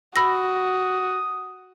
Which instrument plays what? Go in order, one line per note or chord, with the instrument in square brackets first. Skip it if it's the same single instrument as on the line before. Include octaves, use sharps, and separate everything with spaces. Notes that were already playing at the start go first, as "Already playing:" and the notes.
[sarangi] F#4 [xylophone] B5 E6 A#6 [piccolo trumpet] D#6